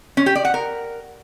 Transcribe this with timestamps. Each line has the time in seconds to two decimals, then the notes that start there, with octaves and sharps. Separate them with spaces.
0.17 C#4
0.26 G4
0.35 D5
0.45 F#5
0.54 A#4